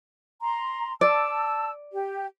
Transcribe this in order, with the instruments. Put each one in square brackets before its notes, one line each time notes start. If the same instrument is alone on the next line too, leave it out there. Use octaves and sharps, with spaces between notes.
[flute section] A#5 C6
[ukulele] D5 [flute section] A5 E6
[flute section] G4